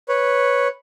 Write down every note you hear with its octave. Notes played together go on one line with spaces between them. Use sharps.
B4 C#5